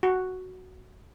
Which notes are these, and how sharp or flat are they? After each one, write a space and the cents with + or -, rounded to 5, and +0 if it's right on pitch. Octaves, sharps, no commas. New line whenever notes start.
F#4 +0